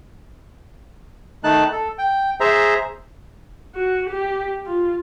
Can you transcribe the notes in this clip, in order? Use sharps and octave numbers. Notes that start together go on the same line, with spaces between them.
D#3 A3 D#4 A5 F#6
A4
G5
G#4 C5 E5 A#5
F#4
G4
F4